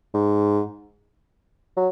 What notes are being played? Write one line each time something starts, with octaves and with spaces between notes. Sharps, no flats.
G#2
F#3